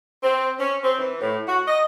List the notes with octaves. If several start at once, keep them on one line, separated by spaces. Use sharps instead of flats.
C4
C#4
C4
E3
A2
F#4
D#5